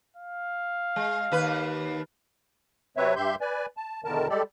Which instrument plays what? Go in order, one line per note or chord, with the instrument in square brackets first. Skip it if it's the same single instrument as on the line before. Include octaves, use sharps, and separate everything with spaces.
[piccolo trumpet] F5
[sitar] G#3
D#2 B4
[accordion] C3 F#3 C4 B4 C#5 E5
G2 G4 E5 C6 G6
B4 D5 G#5
A5
E2 B2 D3 D#3 A#4 A5
G3 G#3 G4 A4 D5